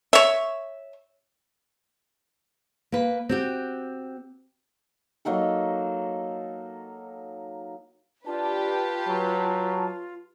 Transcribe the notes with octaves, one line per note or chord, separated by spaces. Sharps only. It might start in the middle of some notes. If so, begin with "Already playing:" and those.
C#5 E5
A#3 B4
C4 F#4 G4
F#3 A#3 D#4 A4
D4 F4 G4 B4 A5
F#3